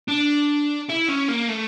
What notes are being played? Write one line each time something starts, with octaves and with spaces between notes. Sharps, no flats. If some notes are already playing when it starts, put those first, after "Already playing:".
D4
E4
C#4
A#3
A3